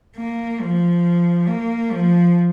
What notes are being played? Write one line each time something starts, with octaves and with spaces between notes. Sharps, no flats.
A#3
F3
A#3
F3